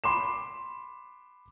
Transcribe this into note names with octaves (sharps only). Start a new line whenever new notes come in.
B5 C6 D6 E7